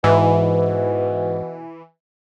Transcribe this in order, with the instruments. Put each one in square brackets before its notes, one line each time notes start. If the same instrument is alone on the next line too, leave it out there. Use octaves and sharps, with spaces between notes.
[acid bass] G#2 [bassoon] B2 [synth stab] E3